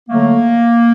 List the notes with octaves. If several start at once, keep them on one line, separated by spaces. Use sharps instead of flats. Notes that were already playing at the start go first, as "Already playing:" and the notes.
D3 F#3 A3 A#3